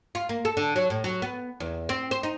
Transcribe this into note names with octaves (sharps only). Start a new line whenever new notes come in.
F4
A#3
A4
D3
F#3
A2
F#3
B3
E2
C4
C5
D#4